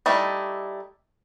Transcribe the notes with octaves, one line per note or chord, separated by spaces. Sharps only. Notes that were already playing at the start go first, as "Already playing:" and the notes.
G3 A3 D#4 E4